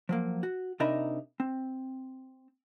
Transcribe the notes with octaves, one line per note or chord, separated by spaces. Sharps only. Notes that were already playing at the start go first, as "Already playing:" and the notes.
F3 F#3 A#3
F#4
C3 D4 D#4 A#4 E5 B5
C4